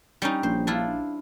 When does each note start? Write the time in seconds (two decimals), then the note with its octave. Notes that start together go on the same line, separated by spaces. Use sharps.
0.22 G3 C#4 D#4
0.43 A#1 C5
0.67 D4 E4 F4